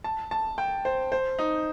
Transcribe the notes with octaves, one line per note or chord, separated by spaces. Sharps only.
A5
A5
G5
C5
C5
D#4